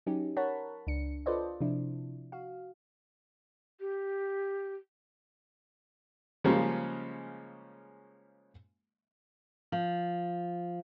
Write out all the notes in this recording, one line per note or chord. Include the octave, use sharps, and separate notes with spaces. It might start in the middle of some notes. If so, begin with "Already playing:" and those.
F#3 C#4 D#4 G4
A#4 C#5 F#5 A5 B5
C#2 D4 C#7
F4 A4 B4 C5 D5 D#5
C3 F3 D4 E4
F#4 F5
G4
C#3 F3 G3 G#3 A#3 C#4
F3